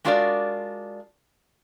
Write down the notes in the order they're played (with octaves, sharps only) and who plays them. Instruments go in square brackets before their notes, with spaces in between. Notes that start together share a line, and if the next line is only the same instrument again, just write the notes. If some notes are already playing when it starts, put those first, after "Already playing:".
[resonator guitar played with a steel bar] G#3 D4 F4 F#4 A#4 D5